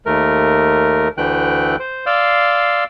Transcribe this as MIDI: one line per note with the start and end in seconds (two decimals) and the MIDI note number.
0.06 1.08 39
0.06 1.08 57
0.06 1.08 70
1.18 1.76 38
1.18 1.76 50
1.18 1.76 52
1.18 1.76 57
1.18 1.76 79
1.18 1.76 90
1.80 2.05 72
2.06 2.84 74
2.06 2.84 77
2.06 2.84 84
2.06 2.84 88